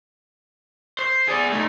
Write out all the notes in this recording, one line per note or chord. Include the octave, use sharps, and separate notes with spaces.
C5
G#4 D5
A3 D#4